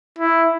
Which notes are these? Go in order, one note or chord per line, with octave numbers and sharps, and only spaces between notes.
E4